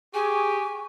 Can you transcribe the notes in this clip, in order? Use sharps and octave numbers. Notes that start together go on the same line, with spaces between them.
G4 G#4 G#5 C#6